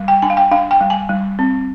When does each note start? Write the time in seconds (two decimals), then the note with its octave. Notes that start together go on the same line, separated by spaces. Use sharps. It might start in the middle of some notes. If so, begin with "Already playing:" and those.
Already playing: G3
0.08 G5
0.22 D4 G#5
0.30 F5
0.37 G5
0.51 D4 F5
0.71 G5
0.81 G3
0.90 G#5
1.09 G3
1.39 C4